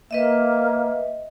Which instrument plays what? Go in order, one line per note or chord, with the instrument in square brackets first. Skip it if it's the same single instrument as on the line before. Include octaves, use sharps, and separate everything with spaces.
[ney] A#3 [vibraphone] B4 D#5 E5